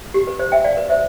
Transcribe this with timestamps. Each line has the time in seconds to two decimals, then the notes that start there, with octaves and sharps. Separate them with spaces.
0.14 G4
0.27 B4
0.39 C5
0.52 E5 G5
0.64 D5 F5
0.77 B4
0.90 C5 E5